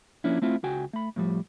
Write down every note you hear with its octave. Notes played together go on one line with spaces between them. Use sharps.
F3 A#3 C#4 D4 E4
A3 C4 E4 F4
C#2 F#4 G5 G#5
A3 B5
A2 F3 G3